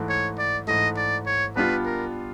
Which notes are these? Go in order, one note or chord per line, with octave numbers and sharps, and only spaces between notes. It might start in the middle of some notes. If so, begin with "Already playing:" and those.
Already playing: G#2 E3 A3
C#5
D5
G#2 E3 A3 D#5
D5
C#5
G3 B3 D4 F4 B4
A#4